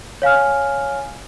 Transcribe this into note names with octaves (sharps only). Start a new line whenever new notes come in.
C#5 F5 G#5 F6